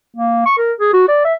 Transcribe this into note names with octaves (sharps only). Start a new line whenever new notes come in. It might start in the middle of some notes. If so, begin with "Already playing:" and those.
A#3
C#6
A#4
G#4
F#4
D5
E5